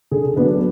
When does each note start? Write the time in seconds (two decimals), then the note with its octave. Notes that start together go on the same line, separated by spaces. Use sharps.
0.11 D3 G#4
0.36 F#3 A3 B3 D4 B4